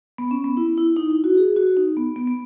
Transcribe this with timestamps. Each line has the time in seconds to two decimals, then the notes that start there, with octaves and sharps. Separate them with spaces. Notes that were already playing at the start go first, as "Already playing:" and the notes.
0.18 B3
0.31 C#4
0.44 B3
0.57 E4
0.78 E4
0.96 D#4
1.10 E4
1.24 F#4
1.37 G#4
1.56 F#4
1.77 D#4
1.97 B3
2.16 B3
2.28 B3